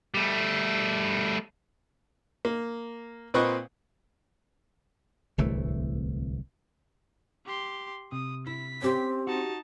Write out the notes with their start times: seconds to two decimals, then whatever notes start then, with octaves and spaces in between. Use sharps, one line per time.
0.14 G3 A3
2.45 A#3
3.34 A#2 C4 B4 D#5 C#6 D#6
5.38 D1 C2 E3 A3
7.46 G4 C6
8.12 C3 D#6
8.47 E4 B6
8.82 C4 C#4 G4
9.27 D#4 F#4 A5